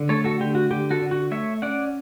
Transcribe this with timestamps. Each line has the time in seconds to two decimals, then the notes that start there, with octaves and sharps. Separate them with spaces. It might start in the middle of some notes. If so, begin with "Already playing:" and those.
Already playing: D3
0.09 A3 A4 C#5
0.24 F#4 A4
0.40 D3 G4
0.55 F#4
0.71 D3 G4
0.91 F#4 A4
1.01 D3
1.11 F#4
1.31 A3 C#5 E5
1.62 C#4 D5 F#5